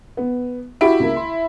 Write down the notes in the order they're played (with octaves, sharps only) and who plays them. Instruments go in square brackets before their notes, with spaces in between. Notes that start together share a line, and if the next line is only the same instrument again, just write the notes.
[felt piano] B3
[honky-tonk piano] E4 [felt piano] F#4 G4 D7
[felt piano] C#2 A#3
C6